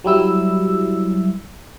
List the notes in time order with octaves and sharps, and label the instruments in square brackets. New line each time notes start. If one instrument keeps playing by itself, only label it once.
[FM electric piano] F#3 G3 E4 E6